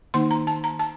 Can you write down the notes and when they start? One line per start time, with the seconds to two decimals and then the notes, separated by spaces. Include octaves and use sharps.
0.14 D#3 A#3 D#4 C6
0.31 A#5
0.47 A5
0.64 A#5
0.79 A5